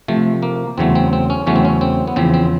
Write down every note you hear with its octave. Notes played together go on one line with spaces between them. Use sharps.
C3 F3 A3
A#3
E2 C#3 F#3 A3 C4
C4
C4
C#4
E2 C#3 F#3 A3 C#4
C4
C#4
C4
B3
E2 C#3 F3 C4
C4